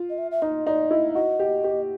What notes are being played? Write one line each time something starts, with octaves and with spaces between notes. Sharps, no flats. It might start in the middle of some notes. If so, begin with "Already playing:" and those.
Already playing: F4
D#5
E5
E5
D#4 D#5
D#4 D5
E4 D#5
F#4 D#5
G4
G4